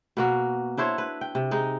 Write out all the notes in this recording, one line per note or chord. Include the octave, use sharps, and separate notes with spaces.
B2 A#3 F#4
D4 E4 C5 C#5
B4
G5
C3
G#3 D#4